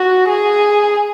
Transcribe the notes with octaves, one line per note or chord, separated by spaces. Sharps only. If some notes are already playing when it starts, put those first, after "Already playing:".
Already playing: F#4
G#4